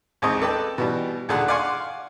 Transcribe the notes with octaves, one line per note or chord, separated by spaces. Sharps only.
A1 D#2 G#3 C4 D#5 C#6
A4 B4 D5 D#5 G5 A5
B2 E3 G3
D#2 A#2 D3 G#4 A4 F#5
D5 F5 F#5 G#5 C6 C#6